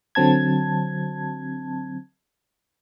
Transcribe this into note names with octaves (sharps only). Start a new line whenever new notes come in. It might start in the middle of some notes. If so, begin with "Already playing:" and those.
D3 F#3 C4 A5 G#6